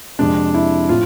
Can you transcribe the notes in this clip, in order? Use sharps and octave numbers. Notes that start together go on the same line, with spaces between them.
F2 C3 G#3 D4
E4
A2 F3 F4